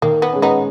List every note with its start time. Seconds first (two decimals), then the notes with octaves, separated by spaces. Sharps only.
0.02 D#3 A#3
0.22 B3
0.33 G#3 C#4
0.42 B3 D#4